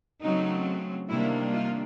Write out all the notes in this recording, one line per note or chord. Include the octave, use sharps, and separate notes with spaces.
C#3 F#3 A3 C4 D#4
C3 D#3 G3 A#3 D4 E4
D#4 F4